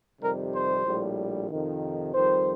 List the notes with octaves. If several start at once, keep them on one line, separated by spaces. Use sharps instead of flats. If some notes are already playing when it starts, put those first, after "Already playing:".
F2 C3 D#3 G3 A#4
C5
A#1 A2 G3
F2 C3 D#3
F2 D#3 G3 C5